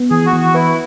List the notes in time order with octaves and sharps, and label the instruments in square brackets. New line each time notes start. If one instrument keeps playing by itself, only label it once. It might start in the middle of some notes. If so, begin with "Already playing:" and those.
Already playing: [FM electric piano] B3
[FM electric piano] E3 [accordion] G#4
[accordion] F#4
[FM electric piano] E3
[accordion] F#4
[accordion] E4 [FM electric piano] B4